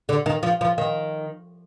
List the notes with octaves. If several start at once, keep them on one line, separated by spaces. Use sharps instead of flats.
D3
D#3
F3
F3
D#3